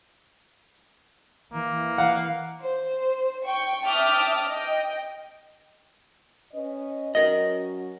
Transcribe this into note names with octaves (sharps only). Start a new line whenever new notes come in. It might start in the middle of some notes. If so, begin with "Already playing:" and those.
E3 A#3
F5 F#5
C5
G5 C#6
E5 G5 A5 D6 D#6 F6
D#5 G5
C#4 B4 D#5
F#3 C#4 F#4 A#4 D#5